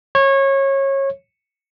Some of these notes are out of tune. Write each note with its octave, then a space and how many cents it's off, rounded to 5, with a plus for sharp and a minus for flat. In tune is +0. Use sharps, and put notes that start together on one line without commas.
C#5 -25